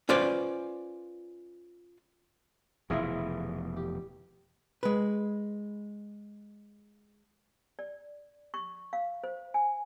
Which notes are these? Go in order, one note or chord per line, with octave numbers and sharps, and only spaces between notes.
C#4 F4 B4 C5 D5
F1 B2 E3 E4 F4 G#4
G4
G#3 B4
D5
C#6
F5
C5
G#5